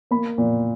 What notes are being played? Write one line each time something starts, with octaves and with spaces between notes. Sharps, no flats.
A#3 B5
A#2